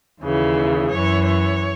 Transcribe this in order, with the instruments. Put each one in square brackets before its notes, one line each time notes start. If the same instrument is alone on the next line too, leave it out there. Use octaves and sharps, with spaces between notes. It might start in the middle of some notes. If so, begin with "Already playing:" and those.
[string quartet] D#2 C#3 E3
F#2 C#5
E3
C#5